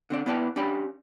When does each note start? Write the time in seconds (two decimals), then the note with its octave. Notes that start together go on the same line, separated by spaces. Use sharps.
0.10 D3 C4 D5
0.26 B3 E4 B4 D5 G5 A5
0.56 C#4 D4 G4 D5 G5 B5